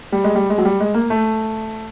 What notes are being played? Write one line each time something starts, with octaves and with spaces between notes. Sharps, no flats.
G3
G#3
G3
G#3
F#3
G3
G#3
A#3
A3